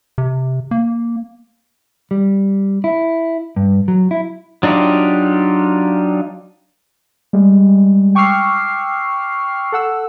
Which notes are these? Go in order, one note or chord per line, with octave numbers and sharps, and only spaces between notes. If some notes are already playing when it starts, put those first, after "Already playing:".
C3
A#3
G3
E4
G2
F#3
E4
F#3 D4 D#4 F4 G4
G3 G#3
G5 C#6 D6 E6 F6 C7
A4 F#5 E6